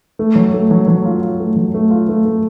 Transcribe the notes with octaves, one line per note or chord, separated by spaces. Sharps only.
A3
F#3
A3
F#3
F#3
F4
F4
A3
F#3
A3
F4
A3
A3